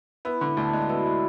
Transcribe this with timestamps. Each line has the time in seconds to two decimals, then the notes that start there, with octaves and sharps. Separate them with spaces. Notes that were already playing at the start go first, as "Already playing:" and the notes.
0.25 B3 E4
0.41 D3
0.57 D2 D4
0.73 G#3
0.82 F#4
0.89 B3 E4
1.06 G#3